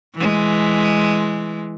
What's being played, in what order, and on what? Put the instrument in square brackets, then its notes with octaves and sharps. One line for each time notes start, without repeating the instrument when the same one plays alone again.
[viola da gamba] E3 G#3